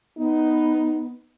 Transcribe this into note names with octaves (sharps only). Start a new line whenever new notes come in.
B3 D#4